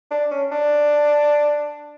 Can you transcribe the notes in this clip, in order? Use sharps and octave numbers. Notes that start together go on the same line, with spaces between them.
D4
C#4
D4